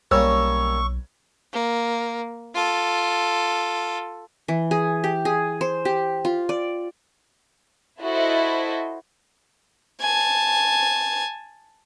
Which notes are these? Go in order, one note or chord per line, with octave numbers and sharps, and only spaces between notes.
B1 G3 A#3 C#4 C#5 C#6 E6
A#3
F4 A4
E3
G#4
G4
G#4
C5
G4
F4
D5
E4 F#4 A4 C5 D#5
G#5 A5